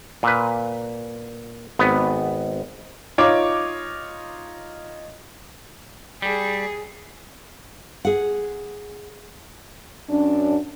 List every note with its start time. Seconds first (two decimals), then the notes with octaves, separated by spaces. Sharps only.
0.23 A#2 B4
1.79 G#1 B3
3.18 D#4 F4 C#5 D6
6.22 G3 G#4
8.05 G#4 F#5
10.09 F#2 C#4 D4